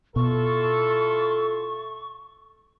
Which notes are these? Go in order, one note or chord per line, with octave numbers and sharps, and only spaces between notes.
B2 E4 F4 A4 C#6